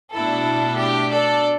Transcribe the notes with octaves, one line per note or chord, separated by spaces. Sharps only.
B2 A3 D4 E4 A4
G4
A4 D5